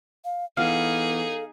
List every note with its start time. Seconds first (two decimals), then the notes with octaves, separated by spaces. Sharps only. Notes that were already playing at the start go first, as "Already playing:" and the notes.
0.25 F5
0.57 E3 B3 D#4 G#4 A4 F5